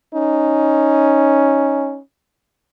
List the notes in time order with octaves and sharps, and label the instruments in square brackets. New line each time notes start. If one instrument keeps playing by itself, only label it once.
[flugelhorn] C#4 [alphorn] D#4